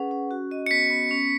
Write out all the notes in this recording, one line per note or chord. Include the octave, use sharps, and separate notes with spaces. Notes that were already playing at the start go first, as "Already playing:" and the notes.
Already playing: C#4 G#4 B4 F#5
C#4
F#4
D#5
C#7
B3 B6
B3
C#4